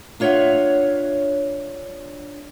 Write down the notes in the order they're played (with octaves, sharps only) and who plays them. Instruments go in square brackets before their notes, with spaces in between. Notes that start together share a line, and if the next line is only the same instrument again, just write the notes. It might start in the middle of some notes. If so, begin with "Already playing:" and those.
[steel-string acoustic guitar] D4 F4 C#5 D5 E5 F#5